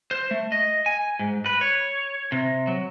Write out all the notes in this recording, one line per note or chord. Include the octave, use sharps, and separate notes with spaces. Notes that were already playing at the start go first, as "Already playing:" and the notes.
C5
A3
D#5
G#5
G#2
B4
C#5
C3
F#3